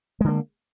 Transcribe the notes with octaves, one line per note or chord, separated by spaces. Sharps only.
D3 G#3 A#3